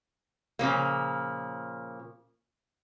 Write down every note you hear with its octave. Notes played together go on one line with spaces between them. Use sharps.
A#2 C#3 F3 A#3